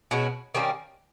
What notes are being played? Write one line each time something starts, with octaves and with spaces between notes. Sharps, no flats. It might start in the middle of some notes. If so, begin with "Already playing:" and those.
B2 G#3 C#4 F#4
D#3 G3 A#3 C#4